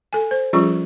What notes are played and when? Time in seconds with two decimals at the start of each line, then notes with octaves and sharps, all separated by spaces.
0.13 A4 G#5
0.31 C5
0.53 F3 G3 C#4 F4 G#4 C#6